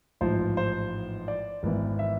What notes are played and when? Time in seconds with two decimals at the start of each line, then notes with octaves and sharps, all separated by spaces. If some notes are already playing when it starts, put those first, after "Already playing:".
0.21 A1 G#2 F3 C5
0.57 C5
1.28 D5
1.63 G#1 G#2 E3 B3
1.99 E5